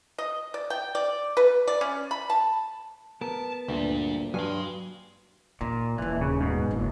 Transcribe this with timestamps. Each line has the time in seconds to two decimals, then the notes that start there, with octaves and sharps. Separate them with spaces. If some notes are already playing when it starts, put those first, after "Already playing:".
0.18 D#5
0.54 D5
0.70 G5
0.95 D5
1.37 B4
1.68 D5
1.81 C#4
2.11 B5
2.30 A5
3.21 B3 A#4 A5
3.69 D2 A#2 G3 D4
4.34 G2 F#3 F5 G#5 C6
5.61 A#2 D#4
5.98 D#1 D#2 E3
6.21 C#3
6.41 G#2 B2
6.71 F#1